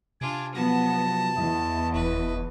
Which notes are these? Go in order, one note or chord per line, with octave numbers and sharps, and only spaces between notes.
C3 D4 F4 G#5 D6
F3 F#3 B3 A5 A#6
E2 E4 D#5
F1 B4